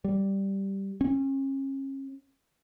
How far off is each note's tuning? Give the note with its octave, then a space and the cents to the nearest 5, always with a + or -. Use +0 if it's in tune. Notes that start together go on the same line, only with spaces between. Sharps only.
G3 -5
C#4 -35